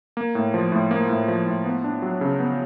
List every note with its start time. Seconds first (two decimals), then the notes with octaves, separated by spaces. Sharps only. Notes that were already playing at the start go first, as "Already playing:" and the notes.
0.17 A#3
0.35 A2
0.54 F3
0.72 A2
0.91 A#3
1.09 A2
1.28 F3
1.46 A2
1.65 B3
1.84 D4
2.02 F#3
2.21 C#3
2.40 B3